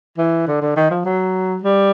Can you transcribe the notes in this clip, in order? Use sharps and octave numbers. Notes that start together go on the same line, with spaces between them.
E3
D3
D3
D#3
F3
F#3
G3